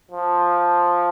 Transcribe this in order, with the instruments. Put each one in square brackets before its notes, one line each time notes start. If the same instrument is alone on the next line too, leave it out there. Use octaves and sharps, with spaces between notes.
[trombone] F3